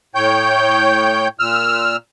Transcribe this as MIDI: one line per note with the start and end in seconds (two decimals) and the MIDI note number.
0.15 1.28 45
0.15 1.28 73
0.15 1.28 79
0.15 1.28 91
1.39 1.96 46
1.39 1.96 88
1.39 1.96 89